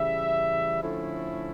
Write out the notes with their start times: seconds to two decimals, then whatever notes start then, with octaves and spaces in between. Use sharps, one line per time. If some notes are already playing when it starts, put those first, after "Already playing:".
Already playing: C#3 E3 G3 E5
0.82 D3 F3 A3 C#4 E4